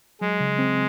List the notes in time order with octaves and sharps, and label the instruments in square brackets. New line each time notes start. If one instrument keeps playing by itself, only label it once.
[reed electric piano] F#3 [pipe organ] G#3
[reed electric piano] C#3
C4